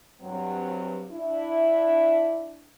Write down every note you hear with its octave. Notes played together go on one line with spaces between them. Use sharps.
G2 F#3 C4
D4 E4